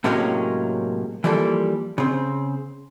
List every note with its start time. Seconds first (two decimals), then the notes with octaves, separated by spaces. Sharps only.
0.04 A2 C3 F#3 G#3 A#3 C#4
1.24 E3 F3 G3 A#3 A4
1.98 C#3 C4